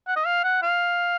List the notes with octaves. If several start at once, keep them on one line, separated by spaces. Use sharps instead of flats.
F#5
D#5
F5
F#5
F5